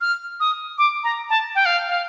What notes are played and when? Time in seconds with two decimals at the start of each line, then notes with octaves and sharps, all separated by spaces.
0.01 F6
0.40 D#6
0.78 D6
1.04 A#5
1.30 A5
1.55 G5
1.66 F5
1.88 F5